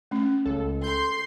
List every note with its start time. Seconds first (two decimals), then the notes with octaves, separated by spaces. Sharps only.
0.11 A3 C#4
0.46 C#2 A4
0.84 C6 G6